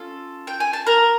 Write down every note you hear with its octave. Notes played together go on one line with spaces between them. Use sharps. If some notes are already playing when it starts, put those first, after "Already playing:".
Already playing: C#4 F4 A4
G5
G#5
A5
A#4 A#5